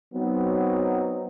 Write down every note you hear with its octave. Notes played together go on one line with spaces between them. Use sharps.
F#3 B3 C4 D#4